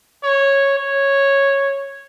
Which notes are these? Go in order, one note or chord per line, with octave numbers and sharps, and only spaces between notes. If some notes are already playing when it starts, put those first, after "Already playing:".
C#5
C#5